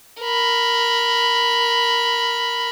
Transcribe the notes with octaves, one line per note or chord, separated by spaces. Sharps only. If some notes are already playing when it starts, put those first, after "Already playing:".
A#4 B5